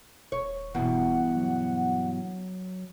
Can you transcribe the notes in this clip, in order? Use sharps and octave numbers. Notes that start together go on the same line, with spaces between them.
D#1 C#5
E2 G2 B2 F#5
F#3